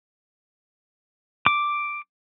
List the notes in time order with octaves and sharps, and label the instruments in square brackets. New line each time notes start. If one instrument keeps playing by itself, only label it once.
[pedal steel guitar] D6